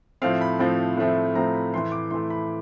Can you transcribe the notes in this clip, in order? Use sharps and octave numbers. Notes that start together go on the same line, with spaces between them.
A2 F3 A3 C4 F5
B5
A2 F3 A3 C4
A2 F3 A3 C4
A2 F3 A3 C4 A#5
B5
A2 E3 A3 C6
D6
A2 E3 A3 C6
B5